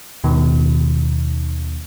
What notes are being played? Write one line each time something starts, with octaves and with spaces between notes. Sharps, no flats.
D#2 B2 D#3